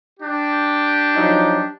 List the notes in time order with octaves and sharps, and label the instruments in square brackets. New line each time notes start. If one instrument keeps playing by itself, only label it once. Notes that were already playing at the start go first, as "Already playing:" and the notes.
[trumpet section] D4 G4
[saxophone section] F3 F#3 D#4